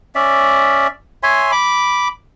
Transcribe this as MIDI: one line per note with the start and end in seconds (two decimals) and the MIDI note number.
0.15 0.88 61
0.15 0.88 74
0.15 0.88 76
1.23 1.51 73
1.23 1.51 76
1.23 1.51 80
1.23 1.51 84
1.52 2.08 83
1.52 2.08 86